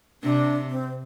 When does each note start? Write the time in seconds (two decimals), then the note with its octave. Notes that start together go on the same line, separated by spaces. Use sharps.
0.23 C3 D4
0.70 C4